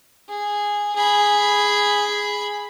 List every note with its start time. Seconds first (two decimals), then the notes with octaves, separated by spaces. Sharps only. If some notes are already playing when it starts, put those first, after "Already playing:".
0.29 G#4
0.95 G#4 B5